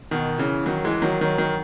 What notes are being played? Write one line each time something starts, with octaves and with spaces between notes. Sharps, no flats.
B2 D#3
C#3 E3
D#3 F#3
E3 G#3
D#3 F#3
D#3 F#3
D#3 F#3